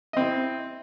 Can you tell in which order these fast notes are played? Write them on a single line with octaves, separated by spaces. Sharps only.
D#5 C4 E4